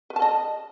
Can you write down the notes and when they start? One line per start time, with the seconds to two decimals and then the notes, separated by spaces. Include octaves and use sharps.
0.10 B4
0.16 A5
0.22 D#5